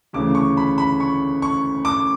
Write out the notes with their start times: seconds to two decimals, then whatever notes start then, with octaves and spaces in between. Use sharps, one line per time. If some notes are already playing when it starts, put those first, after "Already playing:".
0.13 D2 C#3 E3 D6
0.35 C#6
0.57 B5
0.78 B5
1.00 C#6
1.42 C#6
1.85 D6